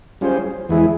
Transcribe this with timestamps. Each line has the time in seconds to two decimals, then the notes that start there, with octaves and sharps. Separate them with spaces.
0.21 G3 C#4 F4 G#4 C5
0.69 E2 E3 G#3 E4 G#4